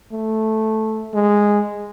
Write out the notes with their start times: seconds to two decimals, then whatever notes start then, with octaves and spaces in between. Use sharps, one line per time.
0.12 A3
1.14 G#3